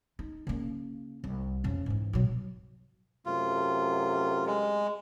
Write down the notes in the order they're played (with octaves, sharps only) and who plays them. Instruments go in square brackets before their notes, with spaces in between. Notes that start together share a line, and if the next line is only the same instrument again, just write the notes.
[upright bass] D#4
C#3 A#3
C2
F2 C#3
G#2 E3
B2 F#3
[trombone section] F#2 C3 A3 [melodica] F4
[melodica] G#3